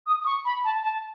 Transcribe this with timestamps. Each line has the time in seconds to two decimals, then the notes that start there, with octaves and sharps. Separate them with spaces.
0.07 D#6
0.21 D#6
0.26 C#6
0.45 B5
0.64 A5
0.83 A5